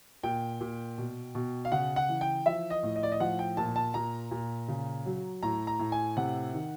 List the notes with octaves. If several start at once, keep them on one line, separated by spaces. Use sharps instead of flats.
A#2 G5
A#2
B2
B2
F5
C#3 F#5
F#5
E3
G5
F3 E5
D#5
A2
D#5
D5
D#5
F3 F#5
G5
A#2 A5
A5
A#2 A#5
A#2
C#3
F#3
A2 A#5
A#5
A2
G#5
C3 F#5
D#3